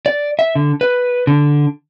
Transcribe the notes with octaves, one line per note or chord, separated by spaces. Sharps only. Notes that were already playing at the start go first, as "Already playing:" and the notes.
D5
E5
D3
B4
D3